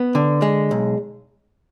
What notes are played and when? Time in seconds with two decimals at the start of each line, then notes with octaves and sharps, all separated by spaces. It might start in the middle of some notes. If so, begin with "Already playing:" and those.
Already playing: B3
0.15 D3
0.42 G#3
0.71 B1